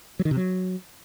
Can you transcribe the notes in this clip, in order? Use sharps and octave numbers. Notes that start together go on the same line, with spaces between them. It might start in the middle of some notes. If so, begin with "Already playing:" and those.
F#3
D#3
C3
F#3